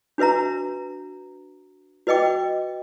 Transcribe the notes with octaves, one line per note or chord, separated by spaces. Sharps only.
D4 F#4 B4 E5 A#5
F#4 B4 D#5 G5 D6